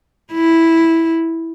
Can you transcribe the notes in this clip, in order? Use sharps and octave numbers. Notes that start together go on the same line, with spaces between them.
E4